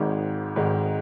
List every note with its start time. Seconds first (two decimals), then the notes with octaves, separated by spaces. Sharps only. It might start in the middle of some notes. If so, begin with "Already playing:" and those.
Already playing: G#1 G#2 D#3 G#3
0.56 G#1 G#2 D#3 G#3